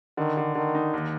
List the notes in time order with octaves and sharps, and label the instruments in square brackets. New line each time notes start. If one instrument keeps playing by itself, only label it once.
[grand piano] D3 [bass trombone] D#3
[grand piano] D3
[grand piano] D3 [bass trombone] D#3
[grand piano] D#4
D#2